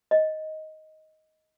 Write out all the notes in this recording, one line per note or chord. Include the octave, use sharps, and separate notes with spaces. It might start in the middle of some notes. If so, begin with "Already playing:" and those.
D#5